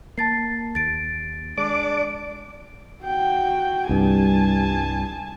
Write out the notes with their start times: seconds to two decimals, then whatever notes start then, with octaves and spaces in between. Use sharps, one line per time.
0.18 A#3 A5 A6 C7
0.75 D#2 A6 D7
1.58 G#3 D4 D5 D6
3.04 F#4 G5
3.89 C2 G2 G#5 A5